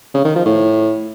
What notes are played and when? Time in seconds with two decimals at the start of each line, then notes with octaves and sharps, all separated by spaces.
0.14 C#3
0.25 D#3
0.35 F3
0.46 A2